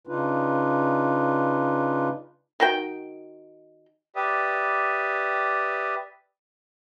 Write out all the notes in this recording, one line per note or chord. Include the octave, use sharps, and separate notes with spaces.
C#3 D4 D#4 F4 B4
D#3 F#4 G5
G4 B4 D5 E5 D#6